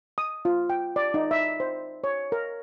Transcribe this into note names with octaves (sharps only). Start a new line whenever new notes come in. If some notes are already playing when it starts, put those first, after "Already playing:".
D#6
F4
G5
D5
D#4
E5
C5
C#5
A#4